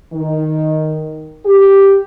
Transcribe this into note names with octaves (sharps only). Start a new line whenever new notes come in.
D#3
G4